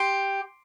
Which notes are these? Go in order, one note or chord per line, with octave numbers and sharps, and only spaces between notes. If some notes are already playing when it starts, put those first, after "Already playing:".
Already playing: G4 C6